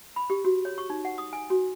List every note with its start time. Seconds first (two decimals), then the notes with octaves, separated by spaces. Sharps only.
0.16 B5
0.30 G4
0.45 F#4
0.65 C#5
0.78 C#6
0.90 D#4
1.05 F#5
1.18 D#6
1.33 G#5
1.50 F#4